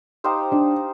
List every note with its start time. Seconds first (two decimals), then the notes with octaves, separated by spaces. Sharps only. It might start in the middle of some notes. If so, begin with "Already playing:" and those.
0.24 D#4 G4 C5 F5
0.52 D4